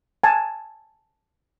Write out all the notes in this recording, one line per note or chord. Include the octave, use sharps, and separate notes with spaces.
G#5 A5